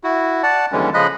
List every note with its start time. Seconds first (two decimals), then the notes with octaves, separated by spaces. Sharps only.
0.04 E4 F#4
0.43 D5 F#5 A5
0.72 D#2 D3 E3 G3 G#3 C#4
0.94 C#3 F3 G#3 D#5 B5 F#6